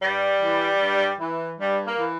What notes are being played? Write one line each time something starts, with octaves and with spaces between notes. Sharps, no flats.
G2 G3
E3
G2
E3
G2 G3
A#3
E3